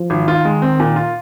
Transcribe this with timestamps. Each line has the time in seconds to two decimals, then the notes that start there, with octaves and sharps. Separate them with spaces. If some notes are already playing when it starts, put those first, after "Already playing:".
Already playing: F3
0.10 G#1
0.27 D#3 F4
0.45 G#3
0.62 C4
0.80 A#2
0.96 F4